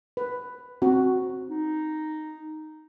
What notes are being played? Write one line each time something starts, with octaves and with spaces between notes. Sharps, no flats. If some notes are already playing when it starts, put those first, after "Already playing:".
B4
C4 F#4
D#4